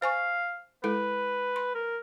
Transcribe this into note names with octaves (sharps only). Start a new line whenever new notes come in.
C5 F5 G#5 C#6
G#3 E4 A4 B4
C6
A#4